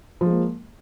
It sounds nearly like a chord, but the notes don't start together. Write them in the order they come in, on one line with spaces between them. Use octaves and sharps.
F3 G#3 A#3